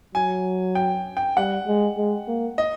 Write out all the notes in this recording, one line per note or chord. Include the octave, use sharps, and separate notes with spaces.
F#3 G#5
G5
G5
G3 F#5
G#3
G#3
A#3
D#5